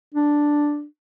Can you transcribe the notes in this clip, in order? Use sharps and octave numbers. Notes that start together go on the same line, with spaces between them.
D4